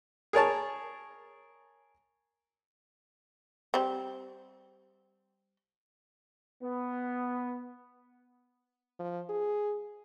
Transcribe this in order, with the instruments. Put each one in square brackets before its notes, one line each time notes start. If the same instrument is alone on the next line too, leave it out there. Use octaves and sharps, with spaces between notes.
[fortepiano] G#4 A#4 C#5 A5
[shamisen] G3 C4
[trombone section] B3
[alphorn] F3
G#4